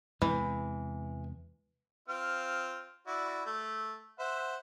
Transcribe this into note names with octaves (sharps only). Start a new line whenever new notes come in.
E2 C3 E3 G#3
C4 F4 F5
E4 F#4 D5
A3
C5 E5 F#5